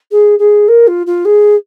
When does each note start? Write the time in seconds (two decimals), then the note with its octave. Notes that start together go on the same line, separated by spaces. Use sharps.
0.12 G#4
0.39 G#4
0.68 A#4
0.87 F4
1.07 F4
1.25 G#4